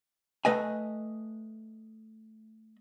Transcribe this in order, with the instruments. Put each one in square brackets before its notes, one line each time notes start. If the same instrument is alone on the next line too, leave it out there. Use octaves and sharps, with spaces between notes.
[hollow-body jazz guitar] A3 B4 D#5 G#5